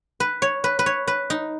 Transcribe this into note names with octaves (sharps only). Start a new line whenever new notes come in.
B4
C#5
B4
B4
C#5
B4
D#4